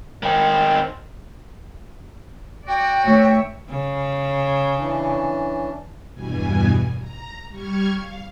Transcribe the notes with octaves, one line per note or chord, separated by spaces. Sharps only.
D#3 C4
F#4 D5 G5
D2 C#5 E5
C#3
E3 C#4 D4
E2 G2 B2 G#5
A#5
G3 C#6 F6 G#6
F5